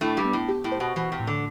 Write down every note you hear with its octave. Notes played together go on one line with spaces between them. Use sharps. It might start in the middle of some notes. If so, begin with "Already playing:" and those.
A2 A3 D4
G2 G3
B3
A2
G4
A2
C5
B2
B2 E3
C3
A2
D3